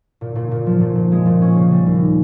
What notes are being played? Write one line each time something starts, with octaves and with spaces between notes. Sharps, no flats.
A#2
A#2
A#2
F3
A#2
A#2
G#3
A#2
C#4
C#3
G3
D#2